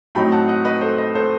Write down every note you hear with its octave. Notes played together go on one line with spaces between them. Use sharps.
A2 F#3 C4 D#4 G5 B5
F#5 A5
D#5 F#5
B4 D#5
A4 C5
B4 D#5
A4 C5